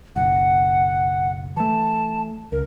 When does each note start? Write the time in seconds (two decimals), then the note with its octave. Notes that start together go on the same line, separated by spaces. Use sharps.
0.16 F#1 B1 F#5
1.57 E3 A3 A5
2.52 C#2 A#4